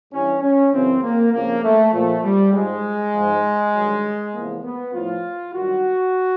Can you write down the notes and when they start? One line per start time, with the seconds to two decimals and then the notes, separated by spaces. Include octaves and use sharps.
0.12 G2 E3 C#4
0.42 C#4
0.73 F#2 C#3 E3 C4
1.03 A#3
1.32 F2 C#3 F3 A#3
1.63 A3
1.93 A#2 F3 A3
2.23 G3
2.53 G#2 F3 G#3
3.13 G#2 F3
3.74 G2 D#3 F#3
4.34 E2 C3 F3 A#3
4.64 B3
4.94 A2 F3 F4
5.54 G2 D#3 F#3 F#4